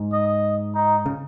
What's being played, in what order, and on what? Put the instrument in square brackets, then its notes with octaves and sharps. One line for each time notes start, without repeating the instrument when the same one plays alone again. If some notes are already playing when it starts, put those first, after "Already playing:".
Already playing: [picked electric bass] G#2
[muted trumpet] D#5
D#4
[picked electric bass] C#3